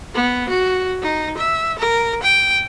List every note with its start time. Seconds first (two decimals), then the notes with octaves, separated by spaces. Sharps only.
0.14 B3
0.49 F#4
1.03 D#4
1.38 E5
1.79 A#4
2.23 G5